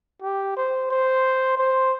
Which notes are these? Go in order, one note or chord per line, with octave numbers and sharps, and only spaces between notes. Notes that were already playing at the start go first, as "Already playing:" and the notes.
G4
C5
C5
C5